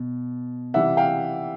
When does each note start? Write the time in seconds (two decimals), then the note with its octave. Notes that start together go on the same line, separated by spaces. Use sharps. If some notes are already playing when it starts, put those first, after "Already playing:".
Already playing: B2
0.74 C3 E3 G3 E5 F#5
0.97 F5 G5